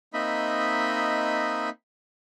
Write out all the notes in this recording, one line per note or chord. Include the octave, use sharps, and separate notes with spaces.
A#3 C4 D#4 D#5 E5 B5